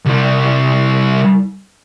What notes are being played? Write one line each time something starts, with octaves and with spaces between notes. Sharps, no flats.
C2 G3